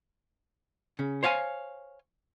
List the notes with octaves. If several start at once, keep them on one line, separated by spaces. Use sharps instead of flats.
C#3 C#4
C5 C#5 F5 F#5 G#5